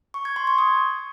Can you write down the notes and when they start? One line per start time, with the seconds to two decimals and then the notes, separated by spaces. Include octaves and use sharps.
0.14 C#6
0.25 G#6
0.36 C6
0.47 C#6
0.58 D#6